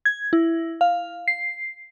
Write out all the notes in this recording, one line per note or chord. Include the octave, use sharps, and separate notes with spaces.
G#6
E4
F5
C7